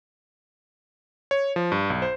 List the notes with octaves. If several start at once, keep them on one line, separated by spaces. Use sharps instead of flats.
C#5
F3
G2
B1
C5